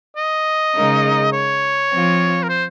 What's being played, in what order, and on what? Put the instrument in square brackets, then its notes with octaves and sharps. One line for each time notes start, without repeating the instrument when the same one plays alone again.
[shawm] D#5
[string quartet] C#3 G#3 D#4 A#4
[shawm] C#5
[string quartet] F3 C4 F4
[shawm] A#4
C5